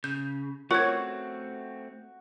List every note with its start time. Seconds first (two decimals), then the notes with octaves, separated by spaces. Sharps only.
0.04 C#3 G6
0.71 A3 C4 F4 F#4 A#4 C#5 C#6 G#6